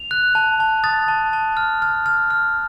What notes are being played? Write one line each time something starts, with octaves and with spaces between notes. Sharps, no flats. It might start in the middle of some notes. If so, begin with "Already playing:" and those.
Already playing: F7
F#6
A5
A5
D#6 A6
A5
A5
F6
F6
F6
F6